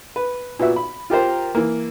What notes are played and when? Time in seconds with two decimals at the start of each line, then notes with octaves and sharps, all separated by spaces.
0.16 B4
0.59 A#2 B3 F#4 E5
0.76 B5
1.10 F4 G4 A#4 C5
1.55 E3 A#3